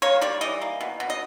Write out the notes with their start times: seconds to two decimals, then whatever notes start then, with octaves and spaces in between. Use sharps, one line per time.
0.02 A#3 C#5
0.21 G3 D5
0.41 E3 D#5
0.61 A#3
0.81 B2
1.00 B2
1.10 D#5